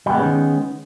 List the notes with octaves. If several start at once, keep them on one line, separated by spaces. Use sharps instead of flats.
D#3 G3 G#3 B3 C#4